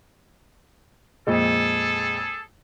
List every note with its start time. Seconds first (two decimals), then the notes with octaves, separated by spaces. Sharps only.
1.27 F2 A#2 G#3 G#4 A4